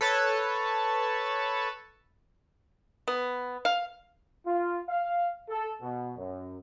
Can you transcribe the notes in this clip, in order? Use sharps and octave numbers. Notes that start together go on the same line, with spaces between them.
A4 B4 C#5 A5
B3
F5
F4
F5
A4
B2
F#2